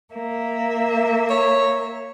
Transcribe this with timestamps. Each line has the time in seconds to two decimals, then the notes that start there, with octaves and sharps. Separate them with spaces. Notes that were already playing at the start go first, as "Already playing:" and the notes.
0.15 A#3 E5
1.30 C#5